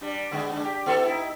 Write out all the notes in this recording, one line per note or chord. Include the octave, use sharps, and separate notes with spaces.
G3 D4
D3 G#3 B3
G#3 D4
G4
B3 E4 A4
D#4 E4